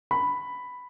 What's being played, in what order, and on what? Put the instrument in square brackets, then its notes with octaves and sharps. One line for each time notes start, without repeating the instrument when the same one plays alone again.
[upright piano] B5